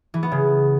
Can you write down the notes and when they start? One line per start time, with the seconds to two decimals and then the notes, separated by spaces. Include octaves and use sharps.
0.14 E3
0.23 B3
0.32 C#3